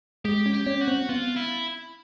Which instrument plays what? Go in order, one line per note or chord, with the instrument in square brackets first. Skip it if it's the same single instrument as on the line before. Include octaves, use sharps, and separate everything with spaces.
[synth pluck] G#3 [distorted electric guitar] G4
[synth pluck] C#4
[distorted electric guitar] G4
[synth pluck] C#4
[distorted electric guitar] F#4
[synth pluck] C4
[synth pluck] B3 [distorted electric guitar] F4
[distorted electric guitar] E4